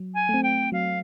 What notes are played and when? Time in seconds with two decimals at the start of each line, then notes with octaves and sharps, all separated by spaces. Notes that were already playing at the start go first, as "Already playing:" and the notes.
Already playing: F#3
0.14 G#5
0.29 A3
0.34 C4
0.43 G5
0.72 F#3 F5